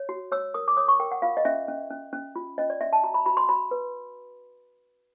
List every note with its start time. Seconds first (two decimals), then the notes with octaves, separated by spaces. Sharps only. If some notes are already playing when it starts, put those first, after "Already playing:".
Already playing: C#5
0.09 F#4
0.32 C#5 E6
0.54 A#4 D#6
0.68 D6
0.77 C#5 D#6
0.88 C#6
1.00 A#4 G5
1.11 F#5
1.22 F4 F5
1.37 D#5
1.45 C#4 E5
1.68 C#4
1.90 C#4
2.13 C#4
2.36 F4
2.58 C#4 D#5
2.70 D5
2.81 C#4 E5
2.93 A5
3.03 F#4 A#5
3.14 B5
3.26 F#4 B5
3.37 C6
3.49 F#4 B5
3.71 B4